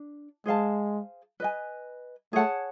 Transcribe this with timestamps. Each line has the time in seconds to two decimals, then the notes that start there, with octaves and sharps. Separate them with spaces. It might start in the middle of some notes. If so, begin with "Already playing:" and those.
Already playing: D4
0.46 G#3 G#4 C5 F5 A5
1.40 B4 D#5 G#5
2.33 A3 G#4 C#5 F#5 A5